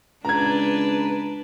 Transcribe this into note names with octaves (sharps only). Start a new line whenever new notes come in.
C#2 D4 B4 A#5 G#6